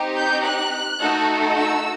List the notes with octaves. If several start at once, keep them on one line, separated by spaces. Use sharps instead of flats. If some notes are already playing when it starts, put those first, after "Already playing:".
Already playing: C4 D#4 G4
G6
F#6
A3 D#4 F#4 A4
E6